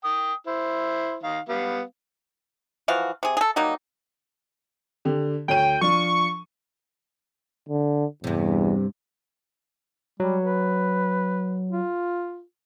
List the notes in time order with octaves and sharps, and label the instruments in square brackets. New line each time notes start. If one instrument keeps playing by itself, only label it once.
[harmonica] G5 D#6
E4 C5
D#3 F5
G3 B3 F5
[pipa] E3 F3 F#4 F5
C3 G#4
G#4 A4
F#3 G3 A#3 D#4
[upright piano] D3 G4
[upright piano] D2 C#5 D#7 [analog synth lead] G5
[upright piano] F3 D4 [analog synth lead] C#6
[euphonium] D3
[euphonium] E2 [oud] G2 C3
[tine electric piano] F#3 [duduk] G3
[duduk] B4
F4